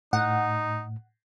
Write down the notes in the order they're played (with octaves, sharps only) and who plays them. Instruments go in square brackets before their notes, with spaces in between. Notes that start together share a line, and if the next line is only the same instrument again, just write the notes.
[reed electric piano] A2 [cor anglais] D#4 [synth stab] F#5